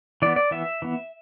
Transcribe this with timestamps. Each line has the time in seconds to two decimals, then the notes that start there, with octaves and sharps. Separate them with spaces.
0.22 E3 B3 D5
0.36 D5
0.51 E3 B3 E5
0.82 E3 B3